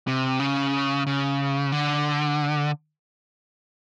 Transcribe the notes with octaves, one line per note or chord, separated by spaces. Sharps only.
C3
C#3
C#3
D3